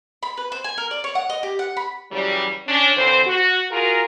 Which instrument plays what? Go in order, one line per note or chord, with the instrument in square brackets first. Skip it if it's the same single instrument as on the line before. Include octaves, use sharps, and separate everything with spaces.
[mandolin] B5
B4
C5
G#5
A#4
D5
C#5
F#5
D#5
G4
F#5
B5
[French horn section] C#3 E3 F#3 G3
C#4 D4
D3 E3 C4 C5
F#4
F4 F#4 G#4 A#4